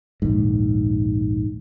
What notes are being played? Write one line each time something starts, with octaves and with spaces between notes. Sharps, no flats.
A#1 D#2 G#2